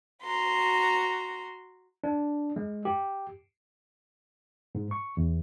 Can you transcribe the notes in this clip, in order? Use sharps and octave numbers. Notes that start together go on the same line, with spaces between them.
F#4 A#5 C6
D4
G#3
G4
G#2
C#6
E2